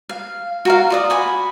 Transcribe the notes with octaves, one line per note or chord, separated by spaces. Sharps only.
F5
F#4 A#4 F5
F4 D5 D#6
F#4 G#5 B5